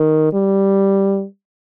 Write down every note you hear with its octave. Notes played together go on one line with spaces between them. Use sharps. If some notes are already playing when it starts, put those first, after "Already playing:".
Already playing: D#3
G3